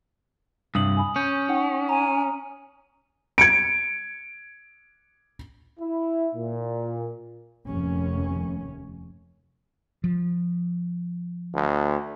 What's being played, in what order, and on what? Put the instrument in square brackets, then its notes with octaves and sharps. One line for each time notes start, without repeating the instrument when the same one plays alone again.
[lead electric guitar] C2 G2 [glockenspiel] D#6 F#7
[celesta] G#5 B5
[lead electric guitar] C#4 [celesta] G6
[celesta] D#4 F#5 G5
[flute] G#5 [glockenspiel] A#5
[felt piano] G#6 C#7 D7
[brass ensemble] E4
A#2
[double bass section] F1 D#2 C#4
[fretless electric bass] F3
[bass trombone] D2